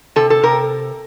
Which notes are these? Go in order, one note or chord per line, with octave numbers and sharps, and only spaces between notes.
C3 A4
A4
C3 A#4